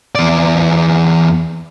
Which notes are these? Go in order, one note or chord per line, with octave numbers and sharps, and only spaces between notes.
E2 D5